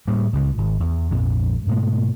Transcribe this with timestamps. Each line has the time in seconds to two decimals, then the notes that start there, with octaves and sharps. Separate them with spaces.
0.08 A2 G3 A3 A#3
0.33 C#2 C#3 G#3
0.58 G#1
0.80 E2
1.10 A#1 F2 G#2
1.67 G#2 B2 G#3 A3